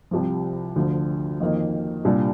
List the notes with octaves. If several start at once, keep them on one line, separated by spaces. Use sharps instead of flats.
C2 C3 F3
D2 D3 F3
F2 D#3 A#3 D#4
C2 A#2 G3 D4